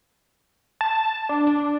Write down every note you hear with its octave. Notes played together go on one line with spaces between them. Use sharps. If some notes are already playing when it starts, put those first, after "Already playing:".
A5
D4
D4